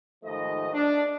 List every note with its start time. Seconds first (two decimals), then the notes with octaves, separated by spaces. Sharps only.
0.24 D#2 G#2 F3 A3 D#5
0.73 D4